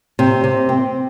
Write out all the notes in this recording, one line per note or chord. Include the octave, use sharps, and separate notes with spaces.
C3
C3
C4